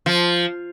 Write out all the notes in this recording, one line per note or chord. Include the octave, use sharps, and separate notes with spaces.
F3